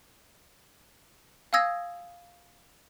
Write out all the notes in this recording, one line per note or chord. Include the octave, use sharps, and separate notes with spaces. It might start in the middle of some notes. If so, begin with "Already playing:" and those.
F5 G#5 D#6 E6 G#6 A#6